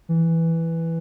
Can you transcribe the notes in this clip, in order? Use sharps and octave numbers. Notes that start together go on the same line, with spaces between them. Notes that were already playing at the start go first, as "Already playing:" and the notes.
E3